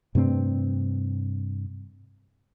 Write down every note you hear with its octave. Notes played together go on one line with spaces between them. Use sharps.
G2 C3 A3 C4